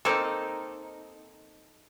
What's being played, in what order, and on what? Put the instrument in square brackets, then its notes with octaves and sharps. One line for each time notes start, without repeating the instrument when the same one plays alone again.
[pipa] A#3 C4 [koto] D#4 A4